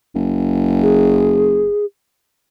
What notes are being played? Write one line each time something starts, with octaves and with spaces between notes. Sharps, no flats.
F#1
G#4